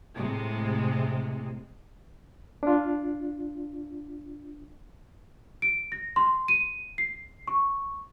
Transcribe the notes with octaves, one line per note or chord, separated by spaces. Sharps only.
A2 C3 G#3
D4 F4
D7
A#6
C6
D#7
C7
C#6